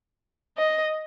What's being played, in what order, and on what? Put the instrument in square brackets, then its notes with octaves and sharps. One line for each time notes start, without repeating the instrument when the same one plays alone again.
[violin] D#5